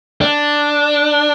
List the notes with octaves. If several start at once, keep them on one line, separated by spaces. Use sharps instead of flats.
D4